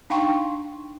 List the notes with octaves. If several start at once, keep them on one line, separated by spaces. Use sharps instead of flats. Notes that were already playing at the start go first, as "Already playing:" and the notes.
D4 D#4 F5 G5 C6 C#6